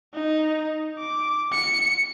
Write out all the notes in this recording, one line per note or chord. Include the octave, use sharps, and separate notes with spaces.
D#4
D6
C#7